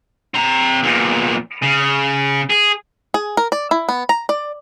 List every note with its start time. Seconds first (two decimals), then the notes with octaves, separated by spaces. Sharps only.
0.34 C4 A#5
0.83 E2 A#2
1.63 C#3
2.50 G#4
3.14 G#4
3.37 A#4
3.52 D5
3.71 E4
3.89 B3
4.09 A#5
4.29 D5